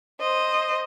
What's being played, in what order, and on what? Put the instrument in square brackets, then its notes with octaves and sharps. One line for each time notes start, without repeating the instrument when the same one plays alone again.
[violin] C5 D#5